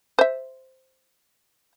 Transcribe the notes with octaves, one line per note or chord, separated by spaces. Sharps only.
C5 E5